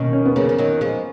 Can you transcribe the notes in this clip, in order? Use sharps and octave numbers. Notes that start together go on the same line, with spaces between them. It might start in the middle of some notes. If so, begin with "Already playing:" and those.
Already playing: B2 D#3 A#3 C#4
C#4
B3
C#3 F3 A#3
F3
D#3 F#3
F3 G#3